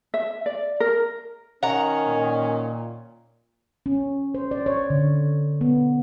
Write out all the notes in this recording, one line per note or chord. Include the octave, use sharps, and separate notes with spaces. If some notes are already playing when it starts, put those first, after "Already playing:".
E5
D5
A#4
D#3 C#4 F#5 A#5
A#2
C#4
C5
D5
C#5
D3
B3